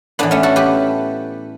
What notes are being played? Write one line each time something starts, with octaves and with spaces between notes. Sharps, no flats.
A2 E3 B3 D4
A3 C#4
F#4 A4
G4 B4